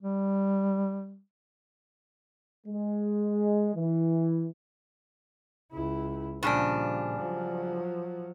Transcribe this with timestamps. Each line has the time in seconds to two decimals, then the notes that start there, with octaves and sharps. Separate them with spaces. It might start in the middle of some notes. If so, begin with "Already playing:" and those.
0.02 G3
2.67 G#3
3.75 E3
5.72 C#2 E4
6.43 G2 A#2 C#3 F3 D4
7.19 F3 F#3